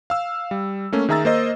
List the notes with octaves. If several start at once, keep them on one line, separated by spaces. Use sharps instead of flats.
F5 E6
G3
A3 A#3 C#4
D#3 G#4 E5 A#5 E6 A6
A#3 C5 D#5